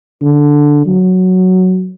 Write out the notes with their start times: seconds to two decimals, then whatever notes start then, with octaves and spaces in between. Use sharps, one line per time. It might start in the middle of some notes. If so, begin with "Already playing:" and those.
0.22 D3
0.87 F#3